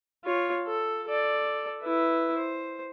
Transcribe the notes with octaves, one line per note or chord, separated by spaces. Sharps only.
F4 C#5
A4
A4 D5
E4 B4
C5